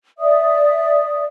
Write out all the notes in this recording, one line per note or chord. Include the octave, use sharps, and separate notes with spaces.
D5 E5 D#6